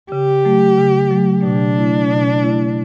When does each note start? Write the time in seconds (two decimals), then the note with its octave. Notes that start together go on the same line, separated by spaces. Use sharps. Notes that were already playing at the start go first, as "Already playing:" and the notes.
0.12 C#3 G4
0.45 F#3 A3
0.78 C#3
1.11 F#3 A3
1.43 B2 D4
1.76 A3 E4
2.09 B2
2.42 A3 E4